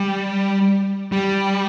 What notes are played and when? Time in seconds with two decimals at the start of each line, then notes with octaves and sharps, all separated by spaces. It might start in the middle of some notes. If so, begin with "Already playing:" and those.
Already playing: G3
1.12 G3